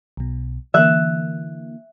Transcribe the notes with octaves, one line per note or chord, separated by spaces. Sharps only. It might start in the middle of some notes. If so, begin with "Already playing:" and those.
B1 B2
D3 E3 A#3 E5 F#6